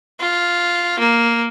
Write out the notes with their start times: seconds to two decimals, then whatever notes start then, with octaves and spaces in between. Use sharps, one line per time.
0.20 F4
0.99 A#3